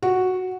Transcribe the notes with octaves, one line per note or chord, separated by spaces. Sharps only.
F#4